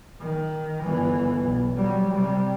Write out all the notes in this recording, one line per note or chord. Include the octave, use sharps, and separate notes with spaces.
D#3
G1 E3
B1
F#3 G3
C3 G3